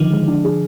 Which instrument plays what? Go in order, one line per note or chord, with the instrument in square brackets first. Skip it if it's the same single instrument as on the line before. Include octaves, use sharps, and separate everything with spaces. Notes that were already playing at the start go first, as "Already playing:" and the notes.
Already playing: [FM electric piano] D3 F3 [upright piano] D#3
[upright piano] G#3
D4
G#4